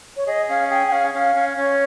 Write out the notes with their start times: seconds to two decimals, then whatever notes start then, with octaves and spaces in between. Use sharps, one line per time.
0.17 C#5
0.27 G#4 D#5
0.49 C#4 F5
0.70 G#4 G5
0.88 G5
0.92 C#4 F5
1.14 C#4 F5
1.35 C#4
1.57 C#4 C#5